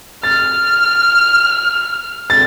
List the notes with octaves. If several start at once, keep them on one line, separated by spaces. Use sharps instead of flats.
F6 A6
A6